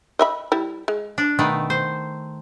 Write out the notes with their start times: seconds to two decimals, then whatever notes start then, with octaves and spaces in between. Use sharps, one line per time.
0.19 D#5 E5 B5
0.52 G3 E4
0.88 G#3
1.18 D4
1.39 B2 D#3 A3
1.70 C5